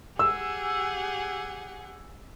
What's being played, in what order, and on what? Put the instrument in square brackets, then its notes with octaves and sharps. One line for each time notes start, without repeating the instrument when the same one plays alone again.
[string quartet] G4 G#4 F#5 [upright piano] E6